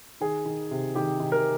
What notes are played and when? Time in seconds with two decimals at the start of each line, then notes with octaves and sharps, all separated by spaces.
0.21 D#3 G#4
0.45 D#3
0.71 C3
0.95 D#3 G4
1.20 D#3
1.32 A#4